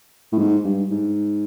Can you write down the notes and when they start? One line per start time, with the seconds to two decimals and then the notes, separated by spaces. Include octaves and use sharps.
0.32 A2
0.38 G#2
0.64 G2
0.91 G#2